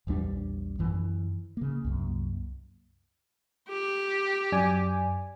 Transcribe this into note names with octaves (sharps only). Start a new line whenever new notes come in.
A#1 E2 G3 D4
F#2 E3
C#3 A#3
C2 F#2 A#3
G4
F#2 D5 G#5